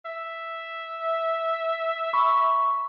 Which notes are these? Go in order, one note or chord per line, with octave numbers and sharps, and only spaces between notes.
E5
B5 C#6